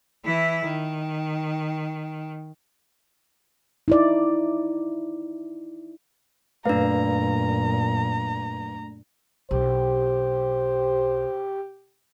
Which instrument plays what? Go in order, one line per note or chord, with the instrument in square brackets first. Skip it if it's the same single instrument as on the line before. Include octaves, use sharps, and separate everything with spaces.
[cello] E3 E4
D#3
[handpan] D#4 E4 D5
[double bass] F#2 A#2 [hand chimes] A3 D4 [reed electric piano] B4 F5 [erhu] A#5
[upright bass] B1 [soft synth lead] G4 [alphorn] C5